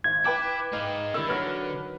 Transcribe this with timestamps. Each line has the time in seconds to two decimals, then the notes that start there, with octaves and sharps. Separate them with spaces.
0.04 G#1 G#6
0.25 E4 B4 G5 D6
0.73 G#3 D#4 F5
1.14 D3 D#3 G3 E4 E6
1.28 D#3 F#3 B4 D5 F6